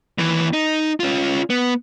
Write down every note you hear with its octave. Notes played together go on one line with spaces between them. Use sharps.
D#2 E3
D#4
C#4 F4
B3